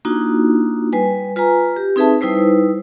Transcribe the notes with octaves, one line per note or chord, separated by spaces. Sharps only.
A#3 D4 D#4 F4 F#4
G3 B4 G#5
F4 B4 G#5 A#5
G4
C4 D#4 G#4 B4 E5 A5
G3 D#4 E4 B4 C5